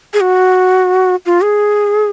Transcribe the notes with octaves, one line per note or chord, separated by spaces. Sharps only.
G#4
F#4
F4
G#4